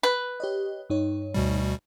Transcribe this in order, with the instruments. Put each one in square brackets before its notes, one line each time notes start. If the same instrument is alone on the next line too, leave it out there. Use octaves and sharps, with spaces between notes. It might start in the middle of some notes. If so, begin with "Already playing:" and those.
[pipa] B4
[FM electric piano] G4 C#5 D#5
G2 D#4 C#5
[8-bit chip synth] D2 B2 G3